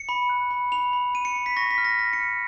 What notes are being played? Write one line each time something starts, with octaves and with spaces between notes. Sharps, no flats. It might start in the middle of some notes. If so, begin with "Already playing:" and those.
Already playing: C#7
B5
F#6
B5
B5 F7
B5
B5 D#7
C#7
B5
B6
C#6 A#6
B6
F6
A#6
F6 A#6
C#7
F6